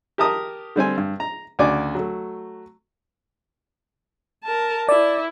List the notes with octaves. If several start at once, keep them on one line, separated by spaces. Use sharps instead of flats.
G4 A#4 A5 A#5 D#6
D3 G3 C4 G#5
G2
A#5
D2 C#3 F#4 D5 G#5 D6
F#3 A3
A#4 A5
E4 D5